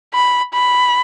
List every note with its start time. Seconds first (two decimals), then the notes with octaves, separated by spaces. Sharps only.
0.14 B5
0.54 B5